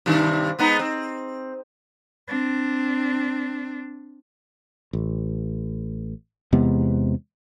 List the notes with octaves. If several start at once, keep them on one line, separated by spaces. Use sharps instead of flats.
G2 C3 D#3
G#3 B3 D#4
C4
C4 D4
A1
E2 C3 G#3 B3